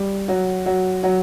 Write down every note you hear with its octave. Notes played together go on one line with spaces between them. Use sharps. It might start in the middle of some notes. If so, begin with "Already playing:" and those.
Already playing: G3
F#3 F#4
F#3 F#4
F#3 F#4